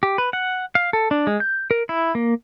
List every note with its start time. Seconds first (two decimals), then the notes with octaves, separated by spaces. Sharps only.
0.03 G4
0.18 B4
0.33 F#5
0.75 F5
0.93 A4
1.11 D4
1.27 G#3
1.40 G6
1.71 A#4
1.89 E4
2.15 A#3